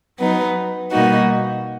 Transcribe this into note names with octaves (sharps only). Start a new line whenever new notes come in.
F#3 B3 D#4
B2 G3 A#3 D#4 F#4